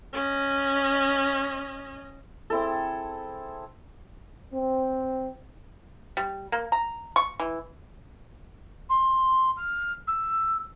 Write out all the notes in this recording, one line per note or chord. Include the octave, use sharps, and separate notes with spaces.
C#4 D#5
C4 E4 G#4 A4
C4
G3
A#3
A#5
C#6
E3
C6
F6
E6